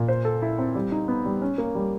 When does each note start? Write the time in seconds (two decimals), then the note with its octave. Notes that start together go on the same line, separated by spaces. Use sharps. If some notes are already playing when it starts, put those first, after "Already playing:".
Already playing: A#2
0.08 C5
0.25 A4
0.42 E4
0.59 C4
0.75 G3
0.92 D#4
1.08 B3
1.25 G3
1.42 C#4
1.58 A#3
1.75 G3